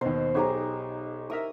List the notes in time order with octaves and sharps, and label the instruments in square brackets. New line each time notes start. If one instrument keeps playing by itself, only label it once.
[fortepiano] D#2 B2 [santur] C5
[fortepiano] B1 G#4 A#5 [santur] D#4 G4 C#5
[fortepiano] E4 A#4 E5 [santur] D#6